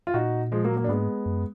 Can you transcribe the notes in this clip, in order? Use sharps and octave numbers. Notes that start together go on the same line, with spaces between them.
F4
A#2 D#4 F#4
F3 G#3
F#3 A#3
F#3 A#3
D4
G#2 G#3 B3
F#2